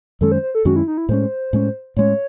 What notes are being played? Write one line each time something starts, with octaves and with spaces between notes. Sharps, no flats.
F#2 D#3 G#3 C#4 A4
C5
C5
A4
F#2 D#3 G#3 C#4 F#4
E4
D#4
E4
A2 G#3 C#4 C5
A2 G#3 C#4
A2 G#3 C#4 C#5